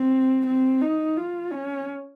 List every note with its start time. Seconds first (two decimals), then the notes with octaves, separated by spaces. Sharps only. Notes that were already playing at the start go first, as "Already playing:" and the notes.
Already playing: C4
0.46 C4
0.82 D#4
1.17 F4
1.51 C#4